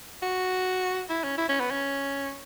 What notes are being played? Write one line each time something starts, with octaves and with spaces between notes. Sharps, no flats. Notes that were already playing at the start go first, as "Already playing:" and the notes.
F#4
E4
C#4
E4
C#4
B3
C#4